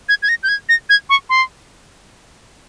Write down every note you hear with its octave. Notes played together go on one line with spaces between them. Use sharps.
G#6
G#6
A#6
G6
G#6
A#6
G#6
C#6
C6